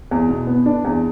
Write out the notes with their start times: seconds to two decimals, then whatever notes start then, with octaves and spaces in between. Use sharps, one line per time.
0.11 E2
0.29 B2
0.47 B3
0.66 D4
0.85 E2